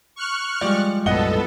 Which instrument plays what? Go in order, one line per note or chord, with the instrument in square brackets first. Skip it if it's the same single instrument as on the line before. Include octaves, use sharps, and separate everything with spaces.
[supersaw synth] C#6 F6 F#6
[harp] F3 G3 G#3 [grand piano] D5
[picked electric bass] B1 F#2 A2 [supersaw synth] B3 A4 [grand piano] D#5 F#5 G7